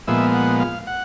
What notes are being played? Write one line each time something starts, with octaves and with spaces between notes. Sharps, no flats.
A#2 F3 G#3 B3 E5
F#5
F5
F#5